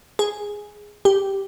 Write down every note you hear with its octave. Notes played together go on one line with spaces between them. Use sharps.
G#4
G4